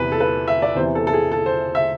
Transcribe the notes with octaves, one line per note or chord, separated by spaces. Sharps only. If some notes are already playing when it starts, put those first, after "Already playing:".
Already playing: E2 C3 E3 B4
A4
B4
E5
D5
E2 C3 E3 C5
A4
A4
G#4
A4
C5
E5